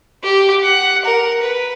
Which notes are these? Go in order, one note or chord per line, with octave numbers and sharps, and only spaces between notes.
G4
F#5
A#4
B4